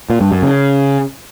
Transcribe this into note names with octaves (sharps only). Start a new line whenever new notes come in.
A#2
G2
F#2
C#3